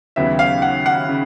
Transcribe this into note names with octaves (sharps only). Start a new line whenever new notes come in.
D#2 C#3 F#3 B3 E5
F5
F#5
F#5
C#3